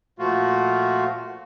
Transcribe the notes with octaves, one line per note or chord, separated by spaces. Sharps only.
A#2 F3 A3 F4 F#4